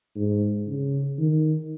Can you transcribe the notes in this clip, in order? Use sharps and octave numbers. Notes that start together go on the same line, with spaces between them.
G#2
C#3
D#3